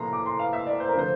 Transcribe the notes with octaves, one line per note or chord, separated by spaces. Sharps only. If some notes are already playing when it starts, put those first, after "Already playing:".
Already playing: A2 F3 A#3 A#5 C6
D6
C6
F5
E5
D5
C5
A#4
D3 F3 A3 C5